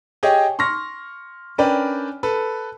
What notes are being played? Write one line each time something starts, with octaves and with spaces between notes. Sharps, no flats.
G4 G#4 C#5 D#5 G5
C6 C#6 F6 A#6
C#4 D4 A#4 B4 D5 G5
A4 B4